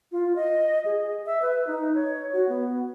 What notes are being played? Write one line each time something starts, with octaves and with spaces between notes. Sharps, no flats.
F4
D#5
G#4
E5
B4
D#4
C#5
F#4
B3